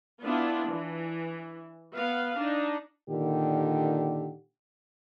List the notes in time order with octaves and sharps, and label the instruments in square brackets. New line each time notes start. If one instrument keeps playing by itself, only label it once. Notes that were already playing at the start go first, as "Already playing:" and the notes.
[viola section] B3 D4 E4 F4
E3
B3 B4 F5
D4 D#4
[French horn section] A#2 D3 D#3 G4